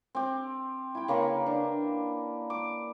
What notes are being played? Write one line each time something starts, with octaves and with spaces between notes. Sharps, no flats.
C4 G4
E4 G5
C#3 A#3 B4 C#6
D4
D6